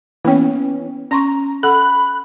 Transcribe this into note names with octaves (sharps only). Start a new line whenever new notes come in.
E3 A#3 B3 C#4 G5
C#4 A#5 C6 C#6
A4 F#5 B5 F#6